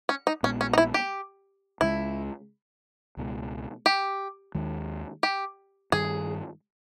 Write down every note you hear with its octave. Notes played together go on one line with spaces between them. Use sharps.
C#4
D#4
A#1 A#2 G#3 B3 C#4
C#4
D#4
E4
G4
C#2 C#3 G#3 E4
C#2 B2 G#3
G4
D#2 D#3 G#3
G4
G2 D#3 G3 G#4